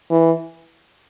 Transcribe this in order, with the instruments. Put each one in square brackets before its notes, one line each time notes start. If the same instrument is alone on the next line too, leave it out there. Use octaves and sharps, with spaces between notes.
[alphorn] E3